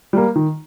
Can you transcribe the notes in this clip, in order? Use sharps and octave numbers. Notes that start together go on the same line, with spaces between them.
G3 A#3
D#3